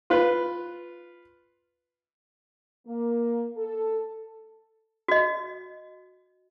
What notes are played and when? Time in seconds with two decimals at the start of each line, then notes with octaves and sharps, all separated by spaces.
0.10 F4 B4
2.87 A#3
3.57 A4
5.08 F#4 D#5